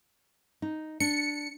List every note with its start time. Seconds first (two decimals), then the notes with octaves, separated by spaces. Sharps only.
0.62 D#4
1.00 D4 C#7